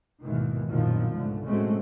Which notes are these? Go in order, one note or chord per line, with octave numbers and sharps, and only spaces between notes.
D#2 G#2 B2 D#3 E3
A#1 F#2 B2 D#3 F3 F#3
C#2 G#2 D3 A3
A2 F#3 G#3 A3 C4 C#4